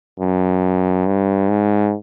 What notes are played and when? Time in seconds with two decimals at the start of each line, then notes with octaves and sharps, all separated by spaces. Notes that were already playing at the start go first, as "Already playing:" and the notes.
0.19 F#2
1.06 G2
1.49 G#2